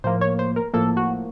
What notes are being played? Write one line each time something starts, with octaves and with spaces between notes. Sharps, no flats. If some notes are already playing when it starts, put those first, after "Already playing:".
A2 F3 A#3 C5
C#5
C5
A#4
A2 F3 A#3 A4
F#4